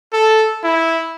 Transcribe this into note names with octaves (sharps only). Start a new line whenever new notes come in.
A4
E4